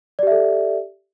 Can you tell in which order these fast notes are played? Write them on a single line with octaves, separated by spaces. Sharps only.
D5 G4 E5 A4